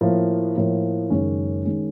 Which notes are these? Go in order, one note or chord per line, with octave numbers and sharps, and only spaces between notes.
A2 F3 A#3
A2 F3 A#3
F#1 F#2 D#3 G#3 C#4
D#3 G#3 C#4